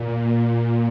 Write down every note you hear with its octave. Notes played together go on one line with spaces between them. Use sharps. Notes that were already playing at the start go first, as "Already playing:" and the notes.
Already playing: A#2